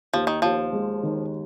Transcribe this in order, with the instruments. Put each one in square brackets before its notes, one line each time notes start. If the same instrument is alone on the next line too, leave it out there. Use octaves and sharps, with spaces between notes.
[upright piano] D#2 [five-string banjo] F3
[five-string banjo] D#3
[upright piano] D#2 [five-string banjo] F3
[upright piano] G#3
D#3